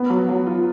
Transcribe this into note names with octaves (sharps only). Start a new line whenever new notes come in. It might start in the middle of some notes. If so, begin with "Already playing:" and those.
Already playing: B3
F#3
F#3
F4